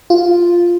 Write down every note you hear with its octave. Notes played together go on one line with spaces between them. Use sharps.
F4